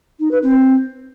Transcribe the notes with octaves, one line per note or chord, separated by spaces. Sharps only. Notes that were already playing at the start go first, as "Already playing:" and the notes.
D#4
B4
C4